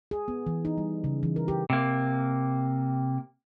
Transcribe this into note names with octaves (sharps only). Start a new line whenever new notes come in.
G#4
B3
E3
D#4
G3
C#3
E3
A#4
G4
C3 A#3